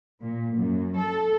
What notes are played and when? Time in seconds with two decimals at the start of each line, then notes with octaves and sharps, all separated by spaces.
0.20 A#2
0.55 F#2
0.96 A4